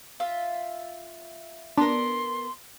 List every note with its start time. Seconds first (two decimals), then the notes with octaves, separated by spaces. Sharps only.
0.20 F4 E5
1.77 B3 D4 A#4 C6